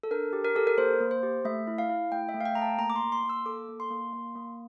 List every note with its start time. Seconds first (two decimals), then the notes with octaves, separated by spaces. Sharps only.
0.03 A4
0.11 D4 A#4
0.33 G4
0.45 A#4
0.55 G4 A4
0.67 A#4
0.78 A#3 C5
1.00 A#3
1.11 C5
1.23 G4
1.45 A3 E5
1.67 E4
1.78 F5
1.89 E4
2.12 A3 G5
2.29 E5
2.34 A3
2.41 F5
2.46 G5
2.55 A3 A#5
2.62 A5
2.79 A#3 A#5
2.90 D6
2.96 C6
3.01 A#3
3.12 C6
3.23 A#3
3.29 E6
3.46 A4 D6
3.68 A#3
3.80 C6
3.91 A#3
4.13 A#3
4.35 A#3